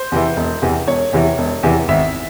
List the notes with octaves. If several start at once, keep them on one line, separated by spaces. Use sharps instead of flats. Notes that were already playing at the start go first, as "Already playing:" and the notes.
Already playing: C5
E2 C3 E3
E1
E2 C3 E3
E1 C#5
E2 C3 E3
E1
E2 C3 E3
G#1 E5